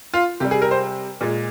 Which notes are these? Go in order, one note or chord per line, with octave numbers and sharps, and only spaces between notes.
F4
C3 G3 G4
G#4
A#4
C5
A#2 G#3